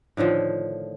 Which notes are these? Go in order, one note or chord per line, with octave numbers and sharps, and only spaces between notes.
A2 D3 D#3 F3